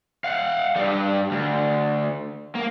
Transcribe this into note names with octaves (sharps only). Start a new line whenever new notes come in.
F5 F#5
G2 G3
D2
A#3